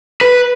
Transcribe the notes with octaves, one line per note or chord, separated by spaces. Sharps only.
B4